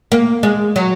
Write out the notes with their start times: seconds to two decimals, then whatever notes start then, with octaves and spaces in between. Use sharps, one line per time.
0.12 A#3
0.43 G#3
0.76 F#3